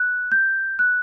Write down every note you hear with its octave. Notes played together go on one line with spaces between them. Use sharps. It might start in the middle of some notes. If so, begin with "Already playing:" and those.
Already playing: F#6
G6
F#6